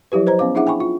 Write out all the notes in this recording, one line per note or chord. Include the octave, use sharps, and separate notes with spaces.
F3 F#3 E4 G4 B4
B4 C5 D#5 A#5
B3 C#4 F5 D6
D4 E4 G#4 E5 F#5 D6
G5 G#5 B5 C#6
F4